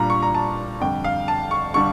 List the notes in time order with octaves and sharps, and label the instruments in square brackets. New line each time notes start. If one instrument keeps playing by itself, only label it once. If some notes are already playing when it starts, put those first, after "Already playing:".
Already playing: [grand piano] A#2 G3 D4 F4 A#5
C#6
A#5
A5
F2 D3 G3 D4 G5
F5
A5
C#6
D3 G3 D4 C#6